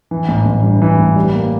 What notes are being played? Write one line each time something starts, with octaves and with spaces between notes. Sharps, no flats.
E3
A1
A1
G2
E3
A1
G3
A#3